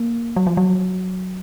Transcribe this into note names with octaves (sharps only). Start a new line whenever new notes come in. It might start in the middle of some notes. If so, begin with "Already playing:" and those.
Already playing: A#3
F#3
F3
F#3